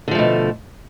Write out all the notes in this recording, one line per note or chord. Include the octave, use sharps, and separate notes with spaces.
B2 D3 F3 A3